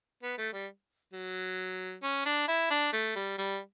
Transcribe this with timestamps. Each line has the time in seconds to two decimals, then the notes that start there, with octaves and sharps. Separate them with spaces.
0.23 B3
0.38 A3
0.53 G3
1.13 F#3
2.03 C#4
2.26 D4
2.48 E4
2.71 D4
2.93 A3
3.16 G3
3.38 G3